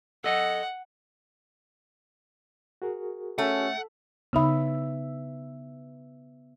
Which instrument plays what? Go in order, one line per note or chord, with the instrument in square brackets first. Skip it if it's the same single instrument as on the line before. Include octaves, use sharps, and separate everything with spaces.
[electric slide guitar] A4 D#5 [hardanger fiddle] F#5
[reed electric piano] F#4 G#4 A#4
[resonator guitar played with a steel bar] A3 [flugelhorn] C#4 [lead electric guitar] F#5
[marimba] C#3 D#4 B5 [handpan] B3 E5